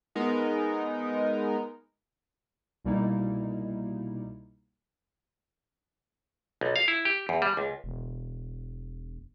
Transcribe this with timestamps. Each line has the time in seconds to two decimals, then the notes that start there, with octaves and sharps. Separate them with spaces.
0.15 G#3 B3 D#4 A#4
2.84 C2 B2 G3 A#3 D#4 E4
6.61 B1
6.76 F5
6.88 E4
7.05 G4
7.29 E2
7.42 G3
7.57 C#2
7.84 E1